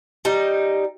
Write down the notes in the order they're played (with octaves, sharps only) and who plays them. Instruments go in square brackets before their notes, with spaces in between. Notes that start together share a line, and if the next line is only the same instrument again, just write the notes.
[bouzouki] G3 D#4